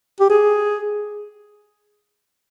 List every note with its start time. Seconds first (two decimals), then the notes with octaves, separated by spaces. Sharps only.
0.20 G4
0.30 G#4